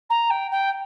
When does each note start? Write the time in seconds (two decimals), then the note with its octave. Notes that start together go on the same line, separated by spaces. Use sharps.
0.10 A#5
0.30 G5
0.51 G5